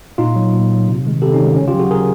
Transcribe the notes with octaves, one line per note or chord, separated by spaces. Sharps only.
A#2 D#4 F4
F#3
A#2
F#3
C3
D#3 G#3
C3 G4 A4
C#4 D#4
D#3 G#3
C#3 C#4
F4 G4
F#3
F#4 G#4
C#3 G#4 A#4